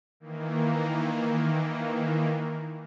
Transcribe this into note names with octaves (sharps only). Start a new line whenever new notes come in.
D#3 E3 A#3